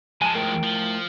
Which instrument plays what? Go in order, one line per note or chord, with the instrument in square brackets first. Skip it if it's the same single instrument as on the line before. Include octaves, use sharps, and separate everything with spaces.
[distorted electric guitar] F3 G#3 [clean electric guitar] G#5 A5
[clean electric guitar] A2 A#4 G5
[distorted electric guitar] F3